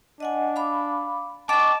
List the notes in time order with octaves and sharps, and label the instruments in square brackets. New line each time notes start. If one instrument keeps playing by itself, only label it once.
[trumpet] D4 [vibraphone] D#5 F#5 G#5
[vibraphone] F5 B5 D6
[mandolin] G4 D6 [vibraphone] D#5 C#6 [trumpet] A5